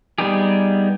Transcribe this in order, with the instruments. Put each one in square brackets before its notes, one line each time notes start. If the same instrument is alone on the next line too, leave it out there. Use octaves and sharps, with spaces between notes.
[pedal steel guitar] G3 B3 D#4 G4 G#4